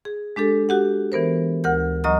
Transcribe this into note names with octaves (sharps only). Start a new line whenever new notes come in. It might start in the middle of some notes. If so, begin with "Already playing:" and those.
G#4
G#3 D4 G4 A4
F#4 G4 F#5
E3 B3 A#4 C5
D2 A#4 F#5 G6
D2 F#3 D#5 A#5 C#6 D#6